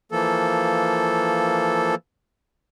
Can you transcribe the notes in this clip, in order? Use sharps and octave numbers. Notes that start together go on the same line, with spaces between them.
E3 F3 A#3 A4